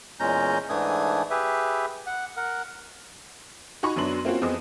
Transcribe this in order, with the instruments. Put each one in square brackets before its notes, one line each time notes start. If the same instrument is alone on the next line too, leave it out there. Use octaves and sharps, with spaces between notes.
[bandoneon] E2 A#2 G#3 C#4 A#5 G6
G#2 E3 A3 D4 G#5 D#6
G4 G#4 B4 E5
F#5
A#4 F#5
[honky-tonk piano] D#4 F#4 G#5 B5 C#6
F#2 F#3 B3 D4 C6 F#7
A#3 C4 C#4 F4 F#4
F2 B3 C4 G#4 D#5 D#6